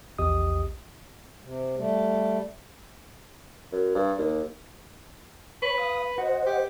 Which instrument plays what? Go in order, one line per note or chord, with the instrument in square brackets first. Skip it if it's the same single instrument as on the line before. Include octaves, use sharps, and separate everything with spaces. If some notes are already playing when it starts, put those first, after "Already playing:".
[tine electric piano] A#1 E2 G4 D#5 D#6
[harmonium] C3
G3 A3
[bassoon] F#2
G2
D#2
[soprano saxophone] B4 [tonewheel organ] C#5 B5 C#6
[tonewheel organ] F5 D#6
[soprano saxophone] F#4 [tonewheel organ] C5 D#5 F#5
[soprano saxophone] G4